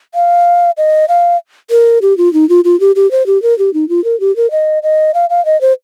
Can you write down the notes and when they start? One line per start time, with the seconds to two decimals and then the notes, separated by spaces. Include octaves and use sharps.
0.15 F5
0.77 D#5
1.08 F5
1.70 A#4
2.02 G4
2.18 F4
2.33 D#4
2.49 F4
2.65 F4
2.80 G4
2.96 G4
3.11 C5
3.26 G4
3.42 A#4
3.59 G4
3.74 D#4
3.89 F4
4.04 A#4
4.20 G4
4.36 A#4
4.51 D#5
4.83 D#5
5.14 F5
5.30 F5
5.45 D#5
5.61 C5